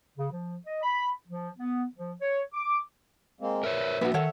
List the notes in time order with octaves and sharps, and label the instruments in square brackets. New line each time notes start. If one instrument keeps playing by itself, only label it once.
[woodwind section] C#3
F3
D#5
B5
F3
B3
F3
C#5
D6
[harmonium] G#3 A#3 C4
[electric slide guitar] A#4 B4 C#5 [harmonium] E5
[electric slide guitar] A#3 D4 [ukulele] F#4 B4
[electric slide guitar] D#3 [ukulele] A4 C#5 F#5